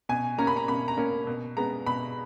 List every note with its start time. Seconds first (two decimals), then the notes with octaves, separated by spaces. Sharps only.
0.09 B2 G#5
0.38 A#3 C#4 A#5
0.47 B5
0.57 A#5
0.68 B2 B5
0.88 A#5
0.98 A#3 C#4
1.27 B2
1.57 G#3 B3 A#5
1.86 B2 B5